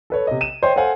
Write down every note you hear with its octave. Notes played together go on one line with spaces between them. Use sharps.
A4 B4 C#5
C3 D#5
D#7 E7
C5 C#5 D#5 G5 C6
A4 C5 F5 F#5 G#5